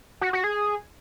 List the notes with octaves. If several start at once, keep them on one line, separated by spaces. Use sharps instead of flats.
F#4
F#4
G#4